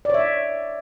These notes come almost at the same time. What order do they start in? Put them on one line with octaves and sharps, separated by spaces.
D5 C#5 E5